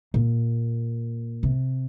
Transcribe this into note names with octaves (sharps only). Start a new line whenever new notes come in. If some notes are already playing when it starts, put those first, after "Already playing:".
A#2
C3